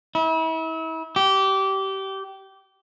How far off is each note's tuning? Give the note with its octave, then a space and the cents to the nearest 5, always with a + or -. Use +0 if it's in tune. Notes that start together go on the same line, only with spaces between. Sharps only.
E4 -35
G4 -20